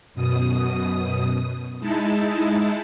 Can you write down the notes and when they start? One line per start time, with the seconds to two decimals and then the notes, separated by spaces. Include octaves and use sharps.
0.14 F#2 B2 D#6
1.80 G#3 D#4 E4 A5